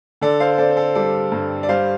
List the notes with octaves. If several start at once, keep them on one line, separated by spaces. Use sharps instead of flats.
D3 A4 D5
C5 F5
C4 A4 D5
C5
A4
G3 A4 D5
G2
D5
G3 C5 F5